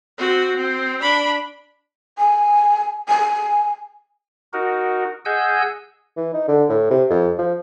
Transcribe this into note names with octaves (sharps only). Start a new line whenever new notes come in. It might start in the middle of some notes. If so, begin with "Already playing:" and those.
C4 F#4
C4
D4 B5
G#5
G#5
D#4 F#4 A#4
G#4 D#5 F#5 G#5 E6 G6
E3
D#4
D3
A2
C3
F2
F3